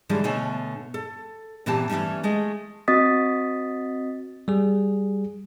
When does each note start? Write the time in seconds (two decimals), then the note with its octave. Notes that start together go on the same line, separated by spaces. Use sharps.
0.09 D3 E3 F3 G3 G#3 C#4
0.24 B2 D3 A3 C#5 G#5
0.94 A4
1.66 A#2 E3 B3 C4 G4 A5
1.89 E3 F#3 G3 A3 C#4
2.23 G#3 A3
2.88 C4 F#4 D#5 D#6 A6 B6
4.48 G3 G#4